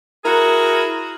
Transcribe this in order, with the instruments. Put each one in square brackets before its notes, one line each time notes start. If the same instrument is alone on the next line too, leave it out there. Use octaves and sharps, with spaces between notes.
[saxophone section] E4 F#4 G#4 A#4